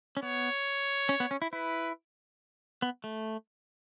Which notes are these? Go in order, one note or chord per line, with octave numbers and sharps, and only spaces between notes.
C#4
B3 C#5
C#4
B3
C#4
E4
E4 B4
B3
A3